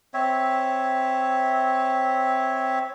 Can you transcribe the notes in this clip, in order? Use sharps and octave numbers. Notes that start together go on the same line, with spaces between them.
C4 C#5 E5